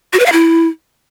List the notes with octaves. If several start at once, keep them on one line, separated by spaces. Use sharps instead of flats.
F#4
B4
F5
E4